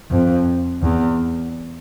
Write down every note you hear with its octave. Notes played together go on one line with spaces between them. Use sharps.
F2
E2